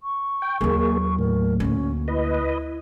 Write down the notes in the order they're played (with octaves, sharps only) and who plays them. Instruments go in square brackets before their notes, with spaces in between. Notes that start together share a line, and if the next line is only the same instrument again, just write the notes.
[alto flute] C#6
[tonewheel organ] G5
[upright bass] D#2 F#3 [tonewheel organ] A#3 G#4
[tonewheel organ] A2 [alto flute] A#4
[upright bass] D2 A#3 [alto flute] C#4
[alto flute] E4 [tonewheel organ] B4 D#5